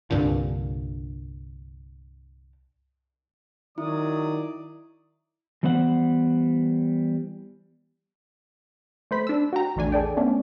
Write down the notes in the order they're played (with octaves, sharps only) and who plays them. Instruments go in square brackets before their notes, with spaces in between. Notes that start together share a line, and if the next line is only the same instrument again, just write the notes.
[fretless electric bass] C2 G2 A#2 D3
[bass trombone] D#3 [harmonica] F#3 D5 D#6 [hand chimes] E4
[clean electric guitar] E3 G3 B3 C5 D5 F#5
[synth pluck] A3 C5 B5 B6
D4 E6
F#4 G5 A#5
A#1 E2 A3 D4 G#5
G#4 A4 D5 G5
A3 B3 C#4 D4